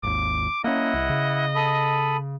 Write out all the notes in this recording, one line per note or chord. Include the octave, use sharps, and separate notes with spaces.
G#1 D#2 D6
A#3 C#4 E4 D#5 F#5
C2
C#3
A4 B5 D#6